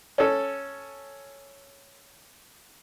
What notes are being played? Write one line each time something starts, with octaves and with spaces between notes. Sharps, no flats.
C#4 A4